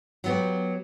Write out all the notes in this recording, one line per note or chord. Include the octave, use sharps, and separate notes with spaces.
F#3 B3 G4